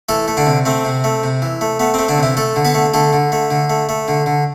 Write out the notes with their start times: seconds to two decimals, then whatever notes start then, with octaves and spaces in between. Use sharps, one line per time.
0.09 E3 A3 A4
0.28 A3
0.37 D3 D4
0.46 C3
0.65 A3 C4
0.85 C3
1.04 A3
1.23 C3
1.42 E3
1.61 A3
1.79 A3 B3
1.94 A3 C4
2.08 D3 D4
2.18 C3 E3 E4
2.37 A3 A4
2.56 D3
2.65 B3 B4
2.75 A3
2.93 D3 A3 A4
3.13 D3
3.32 A3
3.51 D3
3.70 A3
3.89 A3
4.08 D3
4.26 D3